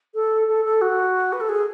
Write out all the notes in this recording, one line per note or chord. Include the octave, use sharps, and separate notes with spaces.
A4
A4
A4
F#4
B4
A4
G#4